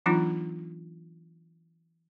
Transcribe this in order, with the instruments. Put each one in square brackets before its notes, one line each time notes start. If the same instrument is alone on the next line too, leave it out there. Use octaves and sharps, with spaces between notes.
[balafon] E3 F#3 B3 D4 D#4 F4